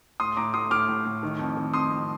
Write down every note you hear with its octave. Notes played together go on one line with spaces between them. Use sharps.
A2 C6 D#6
A2 A#5 D6
A2 C6 D#6
A2 D6 F6
A2
A2
D#3
F2
D#3
F2 C6 D#6
F2